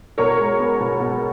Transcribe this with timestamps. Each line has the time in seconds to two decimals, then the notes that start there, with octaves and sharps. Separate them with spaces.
0.18 B2 A#4 C#5
0.39 G#3
0.59 B3
0.80 B2
1.00 B2